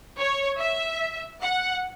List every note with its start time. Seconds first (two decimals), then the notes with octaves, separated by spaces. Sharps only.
0.17 C#5
0.58 E5
1.42 F#5